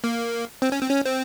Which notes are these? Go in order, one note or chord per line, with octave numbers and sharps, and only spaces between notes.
A#3
C4
C#4
C4
C#4
C4